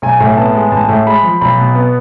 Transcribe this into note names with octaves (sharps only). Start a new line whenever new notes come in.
B1 G#5
A2
B3 A5
G#3
A1 A5
A2
G#3 B5
F3
B1 B5
B2
B3